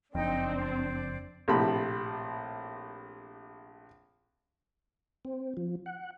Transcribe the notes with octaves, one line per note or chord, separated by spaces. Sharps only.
F#1 F2 C4 D4 D#4 D#5 G5
C5 D5
A#1 A2 C3 B5
C4
F3
F#5